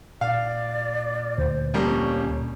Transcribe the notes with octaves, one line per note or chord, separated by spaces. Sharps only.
A#2 D5 F5
D2 C5
F2 G3 A#3 C#4